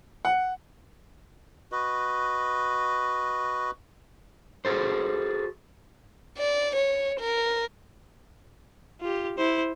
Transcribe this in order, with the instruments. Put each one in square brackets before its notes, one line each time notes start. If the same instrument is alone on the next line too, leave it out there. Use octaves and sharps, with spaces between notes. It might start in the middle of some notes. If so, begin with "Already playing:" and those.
[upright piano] F#5
[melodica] F#4 B4 D#5
[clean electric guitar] F#4 G#4 A4 C5
[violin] D5
C#5
A#4
[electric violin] F4 G4
E4 C5